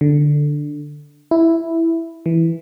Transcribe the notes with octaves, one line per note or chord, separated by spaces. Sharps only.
D3
E4
E3